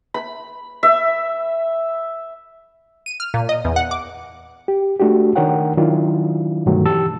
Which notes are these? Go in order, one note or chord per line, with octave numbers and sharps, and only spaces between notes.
B5
E5
D#7
F6
A#2
D#5
E2
F#5
D6
G4
A3 D4 F#4 G4
D#3 D4 A#4 C#5 F#5 G5
D#3 F#3 D4 E4 F4
G2 B2 D3 D#3 F#3 A3
E3 G4 A5 E6 A6